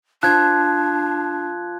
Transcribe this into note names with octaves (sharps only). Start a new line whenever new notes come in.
F3 D4 F#6 G#6